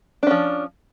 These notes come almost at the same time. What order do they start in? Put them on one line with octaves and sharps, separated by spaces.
D4 C#4 F3